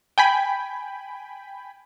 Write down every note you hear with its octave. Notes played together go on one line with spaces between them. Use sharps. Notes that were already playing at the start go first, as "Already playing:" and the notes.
G5 G#5 B5